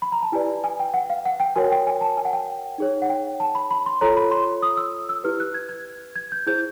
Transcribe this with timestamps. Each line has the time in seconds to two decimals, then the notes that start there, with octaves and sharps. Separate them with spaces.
0.02 B5
0.12 A#5
0.23 A5
0.32 E4 G4 B4 D5 G#5
0.64 G#5
0.79 G5
0.94 F#5
1.10 F5
1.26 F#5
1.40 G5
1.56 F#4 A#4 C#5 G#5
1.72 G5
1.87 G#5
2.01 A5
2.17 G#5
2.25 F#5
2.33 G5
2.78 D#4 G#4 C#5
3.02 F#5
3.09 G5
3.40 A5
3.55 B5
3.71 B5
3.86 C6
4.01 F4 A4 C#5 A#5
4.17 B5
4.31 C6
4.62 D#6
4.77 E6
5.09 E6
5.24 E4 G4 B4 F6
5.40 F#6
5.54 G#6
5.69 G#6
6.16 G#6
6.32 G6
6.47 E4 G#4 C5 G6